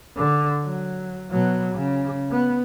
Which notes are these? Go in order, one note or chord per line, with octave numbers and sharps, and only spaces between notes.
D3
F#3
B2 F#3
C#3
B3